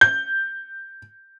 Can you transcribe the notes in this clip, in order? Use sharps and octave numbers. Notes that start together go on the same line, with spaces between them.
G6